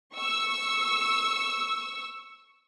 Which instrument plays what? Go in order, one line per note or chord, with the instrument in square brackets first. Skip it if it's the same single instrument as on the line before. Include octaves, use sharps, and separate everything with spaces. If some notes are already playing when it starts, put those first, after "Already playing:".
[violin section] C#6 E6